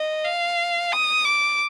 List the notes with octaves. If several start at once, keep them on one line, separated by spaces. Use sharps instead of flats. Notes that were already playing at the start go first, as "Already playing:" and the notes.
Already playing: D#5
F5
D#6
D6